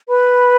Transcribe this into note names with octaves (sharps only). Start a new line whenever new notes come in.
B4 B5